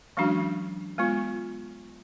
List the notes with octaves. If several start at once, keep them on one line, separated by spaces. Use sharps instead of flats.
E3 F#3 G#3 C#4 D4 F#4
G#3 B3 F4